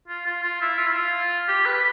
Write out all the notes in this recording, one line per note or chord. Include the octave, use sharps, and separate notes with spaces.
F4
F4
F4
E4
F4
E4
F4
G4
B4